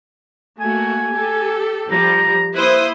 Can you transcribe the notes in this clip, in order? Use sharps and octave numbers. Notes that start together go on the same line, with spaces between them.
A3 A#3 F#4 G#5
G4 A4
F3 G3 A#5
A#3 E4 B4 C5 D#6